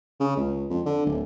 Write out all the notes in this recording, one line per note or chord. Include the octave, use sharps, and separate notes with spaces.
C#3
C#2
F2
D3
D1